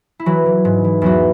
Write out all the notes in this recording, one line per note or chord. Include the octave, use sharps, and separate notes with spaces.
E4
E3 F#3 F#4
E3
G#2
E3
E2 F#3 F#4